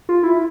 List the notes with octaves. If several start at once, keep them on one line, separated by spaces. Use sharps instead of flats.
F4
E4